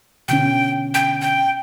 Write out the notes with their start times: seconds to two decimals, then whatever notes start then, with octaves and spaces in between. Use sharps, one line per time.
0.28 B2 D3 C#4 G5
0.94 G5
1.21 G5